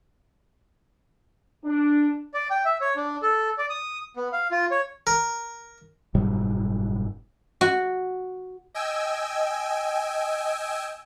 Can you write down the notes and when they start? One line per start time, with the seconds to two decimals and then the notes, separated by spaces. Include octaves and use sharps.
1.65 D4
2.34 D5
2.50 G5
2.65 E5
2.81 C#5
2.96 D4
3.22 A4
3.58 D5
3.70 D#6
4.16 B3
4.33 F5
4.51 F4
4.71 C#5
5.07 A#4
6.15 F#1 G#2 B2 G3
7.61 F#4
8.74 D#5 G5 G#5 E6